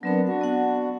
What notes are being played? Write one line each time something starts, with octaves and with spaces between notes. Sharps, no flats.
F#3 B3 C4 D4 A#4
D4 F#4 F#5
B3 F#5